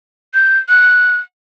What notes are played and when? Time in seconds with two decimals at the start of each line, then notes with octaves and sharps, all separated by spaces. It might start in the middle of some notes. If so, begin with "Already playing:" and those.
0.34 G6
0.69 F#6